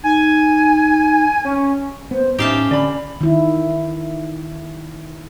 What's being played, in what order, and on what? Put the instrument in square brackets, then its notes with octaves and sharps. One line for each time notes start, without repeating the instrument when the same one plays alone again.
[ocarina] D#4 [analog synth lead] G#5
[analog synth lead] C#4
[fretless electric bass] B3 [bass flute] C5
[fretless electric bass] A2 [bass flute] C#4 [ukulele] D#4 E5 [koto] G4 F5 A5
[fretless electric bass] D3 [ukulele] D5 B5
[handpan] D#3 E4